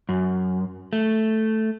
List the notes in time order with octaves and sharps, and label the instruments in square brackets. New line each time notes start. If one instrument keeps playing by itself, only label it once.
[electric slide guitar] F#2
A3